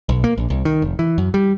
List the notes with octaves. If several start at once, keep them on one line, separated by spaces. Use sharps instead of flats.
B1
A#3
A#1
C2
D#3
F1
E3
F#2
G3